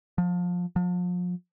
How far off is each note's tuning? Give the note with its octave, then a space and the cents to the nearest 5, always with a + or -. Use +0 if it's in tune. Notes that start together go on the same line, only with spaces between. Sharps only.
F3 +25
F3 +40